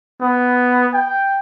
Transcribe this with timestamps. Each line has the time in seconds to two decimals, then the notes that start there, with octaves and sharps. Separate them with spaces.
0.21 B3
0.94 G5